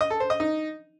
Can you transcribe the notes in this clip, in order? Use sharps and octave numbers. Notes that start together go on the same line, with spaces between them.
D#5
A4
C5
D#5
D#4